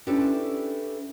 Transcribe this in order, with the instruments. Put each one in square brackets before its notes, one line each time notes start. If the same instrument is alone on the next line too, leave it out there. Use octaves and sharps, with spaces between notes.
[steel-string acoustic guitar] C#4 D4 E4 G4 A4 B4